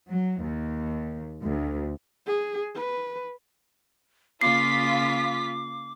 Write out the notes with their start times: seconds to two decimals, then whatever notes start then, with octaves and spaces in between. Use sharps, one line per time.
0.10 F#3
0.43 D#2
1.44 D2
2.26 G#4
2.75 B4
4.41 C#3 A#3 F4 D6 B6 C7